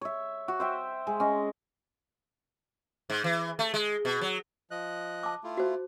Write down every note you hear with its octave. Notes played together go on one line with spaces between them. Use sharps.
C#5 E5
F#4
C5 E5 G5
G#3
C#4 D#5
G#2
E3
A3
G#3
B2
F#3
F3 D#5 F#6
A5 D6
A3 E4 F4
F#4 C5